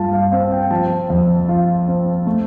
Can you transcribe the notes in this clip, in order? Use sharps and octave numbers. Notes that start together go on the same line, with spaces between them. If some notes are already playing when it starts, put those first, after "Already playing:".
Already playing: G2 F4 A5
F5
C4 F5
G5
F3 A5
F2
F4
C4
A3